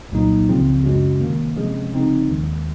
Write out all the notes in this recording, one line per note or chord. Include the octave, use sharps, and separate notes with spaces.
C2 A#2 F#3 A#3 D#4
C#2 C#3 F3 C4 F4
F#2 C#3 G#3 C#4 F#4
C3 D#3 A#3
C3 F3 G#3 C#4 G#4
C#3 F3 C4 D#4
D#2 D#3 G#3